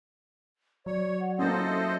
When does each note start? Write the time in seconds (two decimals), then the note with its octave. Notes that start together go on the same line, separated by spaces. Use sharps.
0.86 F#3 C#5 D5
1.20 F#5
1.39 A#3 C#4 E4 A4 C5 D#5
1.66 E5